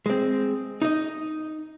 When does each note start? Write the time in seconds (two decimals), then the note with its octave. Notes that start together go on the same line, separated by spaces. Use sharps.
0.06 G#3 C4
0.82 D#4 D#5